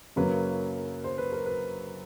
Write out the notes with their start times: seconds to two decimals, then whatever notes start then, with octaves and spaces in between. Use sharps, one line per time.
0.16 F#2 C#3 F#3 A#3 C#4 B4
1.04 C5
1.18 B4
1.32 A#4
1.46 B4